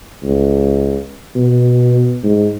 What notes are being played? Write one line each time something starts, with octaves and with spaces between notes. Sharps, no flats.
C#2
B2
G#2